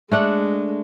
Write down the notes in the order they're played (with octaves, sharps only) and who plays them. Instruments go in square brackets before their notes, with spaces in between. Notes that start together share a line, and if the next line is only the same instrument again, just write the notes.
[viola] G#3 [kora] A3 D4 F#5